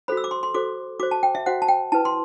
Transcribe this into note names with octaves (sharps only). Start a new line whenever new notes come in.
F#4 A4 C5 B5
E6
D6
C6
C6
F#4 A4 C5 D6
F#4 C5 D6
A5
G5
E5
F#4 C5 F#5
A5
G5
E4 B4 A5
C6